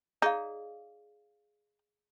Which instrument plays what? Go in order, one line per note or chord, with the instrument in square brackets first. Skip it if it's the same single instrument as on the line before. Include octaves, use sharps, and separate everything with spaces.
[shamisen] D#4 [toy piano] G#4 D5 F5